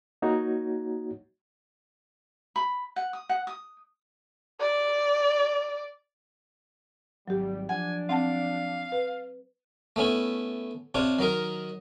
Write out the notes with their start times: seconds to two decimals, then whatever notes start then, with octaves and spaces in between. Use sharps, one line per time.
0.22 A#3 D#4 F#4 C#5
2.56 B5
2.96 F#5
3.13 D#6
3.29 F#5
3.47 D#6
4.61 D5
7.28 G#1 F#3 G3 G4
7.69 F3 D4 F#5 G#5
8.09 C4 F5 F#5 A5
8.92 B4
9.96 A3 B3 C#4 E4
10.95 C3 D4 F4 C#5
11.19 D#3 F#3 D#4 A#4